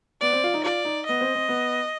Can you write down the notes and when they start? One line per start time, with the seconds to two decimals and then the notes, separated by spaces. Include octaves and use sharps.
0.22 B3 D5
0.33 C4
0.44 F4
0.54 D#4
0.64 F4 D5
0.85 D#4
1.07 B3 D#5
1.21 C4
1.35 C4
1.49 B3